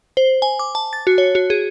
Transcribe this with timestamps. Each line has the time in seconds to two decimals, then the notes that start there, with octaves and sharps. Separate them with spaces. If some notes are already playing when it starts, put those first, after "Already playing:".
0.17 C5
0.42 G#5
0.59 D6
0.75 A5
0.93 A6
1.07 F#4
1.18 C#5
1.35 F#4
1.50 G#4